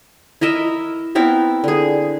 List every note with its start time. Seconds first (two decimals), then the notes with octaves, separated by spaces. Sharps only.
0.41 E4 A#4 D#5 E5
1.15 B3 C4 E4 A#4
1.64 D3 G#4